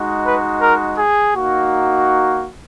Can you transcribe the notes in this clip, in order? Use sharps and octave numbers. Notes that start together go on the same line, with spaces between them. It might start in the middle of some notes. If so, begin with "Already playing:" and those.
Already playing: G#3 D#4 F#4
B4
A#4
G#4
A#3 D#4 F#4